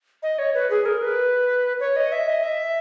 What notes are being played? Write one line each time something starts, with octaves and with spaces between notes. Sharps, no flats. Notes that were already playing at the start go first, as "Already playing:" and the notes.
D#5
C#5
B4
G#4
A#4
B4
C#5
D#5
E5
D#5
E5